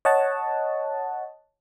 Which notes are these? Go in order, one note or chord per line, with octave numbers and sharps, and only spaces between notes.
C#5 D#5 F#5 A5